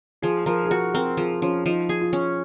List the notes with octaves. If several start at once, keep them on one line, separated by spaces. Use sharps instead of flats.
F3 G#4
F3 A#4
G#4
F#4 A#4
C4 A#4
F3 G#4
F3 C#4
F3 D#4
G#4
F4
C#4